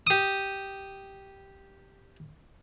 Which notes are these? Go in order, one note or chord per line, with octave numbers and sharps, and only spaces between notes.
G4 D#6